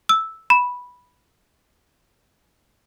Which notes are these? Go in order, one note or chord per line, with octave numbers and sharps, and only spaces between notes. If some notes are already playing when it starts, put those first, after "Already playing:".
E6
B5